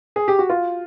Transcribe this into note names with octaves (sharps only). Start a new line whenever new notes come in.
G#4
G4
F#4
F4